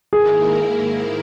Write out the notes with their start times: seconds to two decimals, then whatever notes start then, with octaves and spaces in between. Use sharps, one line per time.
0.13 G#2 D#3 A#3 E4 G#4 A#4